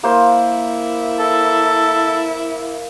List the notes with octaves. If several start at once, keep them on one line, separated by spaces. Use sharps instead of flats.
A#3 E4 C5
A4